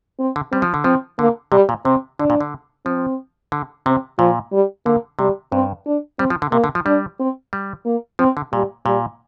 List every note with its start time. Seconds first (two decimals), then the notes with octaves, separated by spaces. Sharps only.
0.19 C4
0.36 D3
0.52 G3 C4
0.62 F3
0.74 D3
0.84 F3 C4
1.19 D3 A#3
1.52 C3 G3
1.69 A#2
1.85 C3 C4
2.19 D3 D4
2.30 A#2
2.41 D3
2.85 F3 C4
3.52 D3
3.86 C3 C4
4.19 A#2 F3
4.52 G3
4.86 D3 A#3
5.19 C3 G3
5.52 G2 C4
5.86 D4
6.19 G3 C4
6.30 F3
6.42 D3
6.52 C3 A#3
6.64 D3
6.75 F3
6.86 G3 D4
7.19 C4
7.53 G3
7.85 A#3
8.19 F3 C4
8.37 D3
8.53 A#2 G3
8.86 A#2 G3